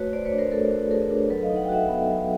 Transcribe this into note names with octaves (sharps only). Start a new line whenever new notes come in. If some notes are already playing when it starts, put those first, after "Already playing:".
Already playing: A3 F#4 B4 C#5
A3 C5 D5
B4 C#5
D4
A#4 C5
A3 A4 B4
F#4
A3 G#4 A#4
D4
F#3 A4 B4
D#5 F5
D#4
F#5
G5
F#4 E5 F#5
B3
F#3